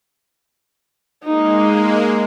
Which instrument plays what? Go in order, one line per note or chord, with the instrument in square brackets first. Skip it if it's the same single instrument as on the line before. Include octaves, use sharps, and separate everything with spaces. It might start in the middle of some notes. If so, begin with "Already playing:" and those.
[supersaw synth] G#3 A#3 [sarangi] D#4